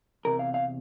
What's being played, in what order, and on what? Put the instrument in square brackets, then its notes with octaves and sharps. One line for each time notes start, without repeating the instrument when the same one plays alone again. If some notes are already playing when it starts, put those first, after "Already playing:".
[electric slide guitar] E2 C3 A#4
F5
F5